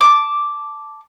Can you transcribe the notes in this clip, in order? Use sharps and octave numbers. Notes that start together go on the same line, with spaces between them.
A5 D6